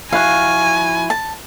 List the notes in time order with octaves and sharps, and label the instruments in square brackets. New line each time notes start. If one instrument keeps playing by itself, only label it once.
[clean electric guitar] F3 E4 F#4 [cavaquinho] F5 [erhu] G#5
[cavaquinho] A5